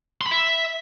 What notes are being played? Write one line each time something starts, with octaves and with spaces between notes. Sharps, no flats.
C6
B5
E5